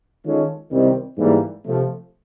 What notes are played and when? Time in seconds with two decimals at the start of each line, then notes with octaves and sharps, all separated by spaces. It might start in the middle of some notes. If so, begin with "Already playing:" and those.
0.25 D#3 G#3 C#4 F4 A4
0.71 C2 C3 D#3 G3 C4
1.18 G#2 E3 G3 A#3
1.64 C3 F3 A3